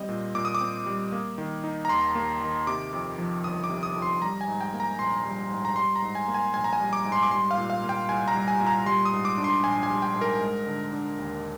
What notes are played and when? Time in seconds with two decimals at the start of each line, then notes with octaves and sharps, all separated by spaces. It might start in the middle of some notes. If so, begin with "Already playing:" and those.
Already playing: G3 C4 D#5
0.09 A#2
0.35 A#2 D6
0.45 D#6
0.55 D6
0.61 C4
0.86 G3
1.12 A#3
1.38 D#3
1.64 D#4
1.85 A#5
1.89 D#2 C6
2.15 A#3
2.41 D#3
2.67 C3 D6
2.93 F2
3.18 F3
3.44 G1 D#6
3.64 D6
3.69 C3
3.83 D#6
3.96 F2
4.02 C6
4.22 G3 A#5
4.41 G#5
4.48 G#2
4.61 G5
4.74 A#3
4.80 A#5
4.99 A#1 C6
5.25 G3
5.51 G#2
5.65 A#5
5.76 G3 C6
5.96 A#5
6.02 G#2
6.15 G#5
6.28 A#3
6.34 G#5
6.53 A#1 G#5
6.64 A#5
6.73 G#5
6.80 G3
6.93 D6
7.05 G#2
7.12 C6
7.23 D6
7.31 G3 C6
7.51 F5
7.57 A#2
7.70 F5
7.83 A#3
7.89 G5
8.09 C2 G#5
8.28 A#5
8.35 G3
8.48 G#5
8.60 A#2
8.67 A#5
8.86 G3 C6
9.05 D#6
9.13 G#2
9.25 D6
9.38 D4
9.44 C6
9.64 A#1 G#5
9.83 G#5
9.90 G3
10.02 G5
10.16 G#2
10.21 A#4
10.41 G#3
10.67 D3
10.93 D4
11.19 D#2